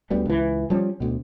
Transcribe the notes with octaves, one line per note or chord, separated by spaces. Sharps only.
D2 G3 B3
C#2 E3
F3 G3 C#4
D2 B2